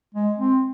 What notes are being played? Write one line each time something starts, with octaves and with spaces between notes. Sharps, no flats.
G#3
C4